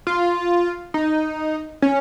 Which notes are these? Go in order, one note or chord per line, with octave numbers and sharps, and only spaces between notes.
F4
D#4
C#4